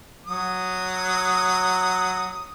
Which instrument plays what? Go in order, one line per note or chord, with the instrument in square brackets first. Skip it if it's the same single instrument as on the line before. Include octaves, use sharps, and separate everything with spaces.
[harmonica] F#3 D#6